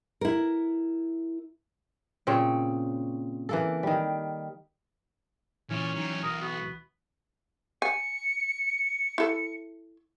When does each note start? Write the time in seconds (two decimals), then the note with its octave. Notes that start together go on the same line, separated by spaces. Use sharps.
0.21 E4 A#4
2.27 A#2 C#3 C4 C#5
3.49 E3 A#3 A4
3.83 D#3 G3
5.70 A#2 E3 C#4 C#6
5.96 F#3 G3 D#4
6.23 B1 A#4 D#6
6.41 B3 F#4
7.82 G#5 C#7
9.18 E4 A4